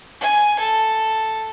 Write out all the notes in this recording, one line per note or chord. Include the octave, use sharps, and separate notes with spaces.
G#5
A4